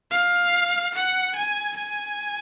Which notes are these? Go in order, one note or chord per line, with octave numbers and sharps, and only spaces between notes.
F5
F#5
G#5
G#5